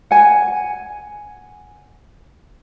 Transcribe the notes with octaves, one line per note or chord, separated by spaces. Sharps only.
F#5 G#5